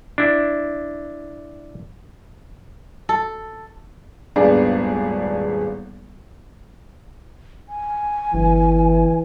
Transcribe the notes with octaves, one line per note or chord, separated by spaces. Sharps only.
D4 E4
A4
D#1 G#1 B3 D4 G#4 D5
G#5
G1 E3